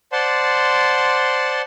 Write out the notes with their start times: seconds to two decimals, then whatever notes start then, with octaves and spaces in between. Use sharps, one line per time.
0.12 C5 D5 F#5 A5 C6